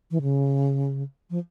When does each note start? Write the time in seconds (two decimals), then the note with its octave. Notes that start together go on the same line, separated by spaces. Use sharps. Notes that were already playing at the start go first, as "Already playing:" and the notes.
0.11 E3
0.22 C#3
1.30 F3